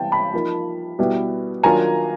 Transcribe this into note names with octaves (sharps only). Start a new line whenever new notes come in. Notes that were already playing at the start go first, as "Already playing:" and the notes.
Already playing: C3 E3 G3 B3 G5 A5
A5 B5
F3 A#3 D#4
B2 G3 B3 E4
D#3 F#3 A#3 D4 F4 G#5 A#5